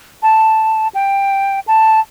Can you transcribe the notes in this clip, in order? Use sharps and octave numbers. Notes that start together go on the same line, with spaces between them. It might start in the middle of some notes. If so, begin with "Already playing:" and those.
A5
G5
A5